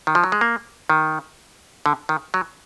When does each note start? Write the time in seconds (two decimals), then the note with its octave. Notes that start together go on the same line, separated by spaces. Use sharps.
0.07 D#3
0.15 F3
0.24 F#3
0.32 G#3
0.41 A#3
0.90 D#3
1.86 D3
2.09 D#3
2.34 F#3